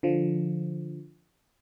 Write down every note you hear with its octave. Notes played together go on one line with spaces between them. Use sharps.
D3 F3